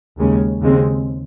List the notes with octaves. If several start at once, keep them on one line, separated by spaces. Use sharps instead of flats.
D#2 C#3 G#3 C#4
D#2 C#3 G#3 C4